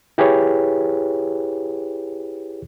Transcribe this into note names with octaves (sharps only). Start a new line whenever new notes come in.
E4 G4 G#4 B4 C#5